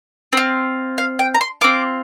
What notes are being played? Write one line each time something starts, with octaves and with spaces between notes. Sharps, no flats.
C4 F4
F5
G5
A#5
C6
C4 F4 D6